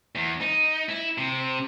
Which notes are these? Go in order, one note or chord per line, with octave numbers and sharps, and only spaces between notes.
E2
D#4
E4
C3